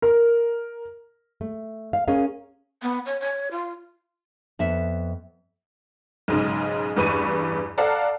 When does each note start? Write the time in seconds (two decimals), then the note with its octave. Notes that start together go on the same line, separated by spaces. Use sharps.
0.02 A#4
1.41 A3
1.93 F5
2.08 C#4 G#4 A#4 F5
2.82 B3
3.06 C#5
3.20 C#5
3.51 F4
4.59 F2 B3 E5
6.28 B1 G#2 C#3
6.96 A1 E2 G2 B4 C#6 D#7
7.78 A4 D5 F5 F#5 A5 A#5